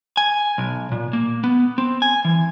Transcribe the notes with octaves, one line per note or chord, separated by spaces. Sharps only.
G#5
B1
A#2
A#3
B3
C4
G#5
E3